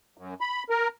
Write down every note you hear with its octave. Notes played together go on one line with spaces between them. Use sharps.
F#2
B5
A#4